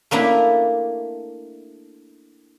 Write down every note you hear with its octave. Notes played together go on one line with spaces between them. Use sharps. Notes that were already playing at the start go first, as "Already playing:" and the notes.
A3 A#3 D4 E4